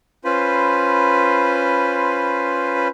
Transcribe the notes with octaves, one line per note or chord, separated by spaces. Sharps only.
C#4 F4 B4 C5 B5